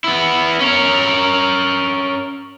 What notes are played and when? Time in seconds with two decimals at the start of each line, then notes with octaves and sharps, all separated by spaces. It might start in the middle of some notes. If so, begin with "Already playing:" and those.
0.04 B3 E4
0.60 C#4 A#4